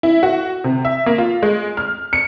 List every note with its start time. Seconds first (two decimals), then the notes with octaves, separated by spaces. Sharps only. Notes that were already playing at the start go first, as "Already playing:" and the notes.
0.03 E4
0.23 F#4
0.64 C3
0.85 E5
1.06 A#3
1.18 F4
1.43 G#3
1.77 F6
2.13 C#7